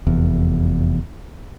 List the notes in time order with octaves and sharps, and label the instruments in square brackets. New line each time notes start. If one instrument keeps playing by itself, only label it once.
[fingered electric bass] F1 E2